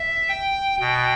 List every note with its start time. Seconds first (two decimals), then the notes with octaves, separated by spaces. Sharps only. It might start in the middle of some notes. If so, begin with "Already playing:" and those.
Already playing: E5
0.28 G5
0.80 B2 G5